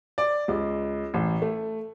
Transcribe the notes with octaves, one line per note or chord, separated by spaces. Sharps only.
D5
C#2
A1
A3